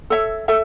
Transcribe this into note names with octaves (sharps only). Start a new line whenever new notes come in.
A4 C#5 E5
A4 E5